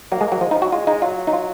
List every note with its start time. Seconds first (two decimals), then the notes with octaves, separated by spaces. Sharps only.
0.11 F#3 A#3
0.21 G#3
0.27 F#3 A#3
0.41 F3 G#3
0.51 F3 D#4
0.62 F#3 F#4
0.71 G#3 F4
0.86 G#3 D#4
1.02 F#3 F4
1.27 D#4
1.33 F4